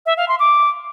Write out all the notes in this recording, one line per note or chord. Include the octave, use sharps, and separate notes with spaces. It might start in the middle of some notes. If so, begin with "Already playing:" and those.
E5
F5
C6
D6